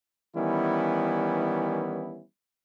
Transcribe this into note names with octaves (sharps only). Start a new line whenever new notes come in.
D#3 E3 G3 B3 C#4 E4